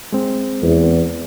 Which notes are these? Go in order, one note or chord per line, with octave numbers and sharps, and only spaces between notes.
G#3 C4
E2